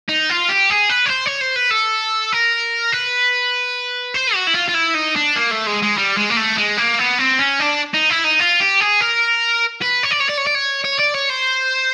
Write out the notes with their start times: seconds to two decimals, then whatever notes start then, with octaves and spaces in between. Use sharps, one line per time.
0.09 D#4
0.29 F4
0.49 G4
0.70 G#4
0.89 B4
1.06 C#5
1.10 C5
1.26 C#5
1.41 C5
1.56 B4
1.71 A4
2.32 A#4
2.92 B4
4.14 C5
4.34 F#4
4.47 E4
4.55 F4
4.69 F4
4.75 E4
4.95 D#4
5.16 D4
5.36 A#3
5.51 A3
5.66 G#3
5.82 G#3
5.98 G3
6.17 G#3
6.30 A#3
6.37 A3
6.58 G#3
6.77 A#3
6.99 B3
7.19 C4
7.39 C#4
7.60 D4
7.94 D#4
8.10 E4
8.25 D#4
8.40 F4
8.61 G4
8.81 G#4
9.01 A#4
9.82 B4
10.03 C#5
10.11 D5
10.20 C#5
10.29 D5
10.37 C#5
10.46 D5
10.55 C#5
10.84 C#5
10.99 D5
11.14 C#5
11.29 C5